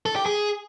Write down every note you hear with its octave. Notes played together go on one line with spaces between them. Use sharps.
A4
G4
G#4